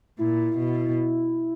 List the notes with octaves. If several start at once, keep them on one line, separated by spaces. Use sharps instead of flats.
A#2 E4
B2